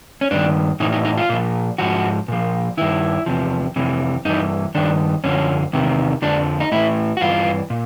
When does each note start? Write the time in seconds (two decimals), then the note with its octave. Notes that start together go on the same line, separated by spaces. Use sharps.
0.21 C#4
0.31 G2 D#3 D4
0.80 A2 E3 D#4
0.93 D#4
1.05 D#4
1.17 F4
1.29 A#2 F3
1.78 G#2 F3 F#4
2.28 A#2 F3
2.77 G2 D#3 E4
3.26 E2 C3 F3
3.76 F2 C3 E3
4.25 G2 E3 D#4
4.75 G2 D#3 D4
5.24 F#2 D3 F3 C#4
5.73 E2 C3 D#3
6.22 F2 D3 F3 D4
6.60 D#4
6.72 A2 E3 E4
7.17 F#4
7.21 G2 E3 F4
7.70 A#2